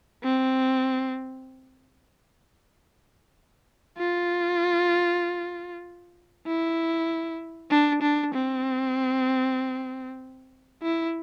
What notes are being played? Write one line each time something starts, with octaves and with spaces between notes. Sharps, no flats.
C4
F4
E4
D4
D4
C4
E4